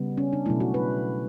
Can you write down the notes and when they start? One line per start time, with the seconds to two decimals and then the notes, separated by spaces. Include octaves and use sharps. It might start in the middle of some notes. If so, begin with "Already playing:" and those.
Already playing: C#3 G3 B3
0.17 C#4
0.33 D4
0.46 B2 F#3 A3 E4
0.60 F#4
0.74 B4